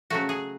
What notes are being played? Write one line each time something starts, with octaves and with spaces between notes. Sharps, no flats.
C#3 F#3 A3 F#4
G#4